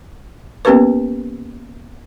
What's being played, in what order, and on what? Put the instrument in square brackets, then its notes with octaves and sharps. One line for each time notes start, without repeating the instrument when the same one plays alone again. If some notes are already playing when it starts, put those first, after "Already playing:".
[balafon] A#3 B3 C#4 G4 A#4 B4